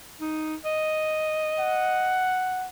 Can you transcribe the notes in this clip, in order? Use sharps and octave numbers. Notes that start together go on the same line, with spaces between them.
D#4
D#5
F#5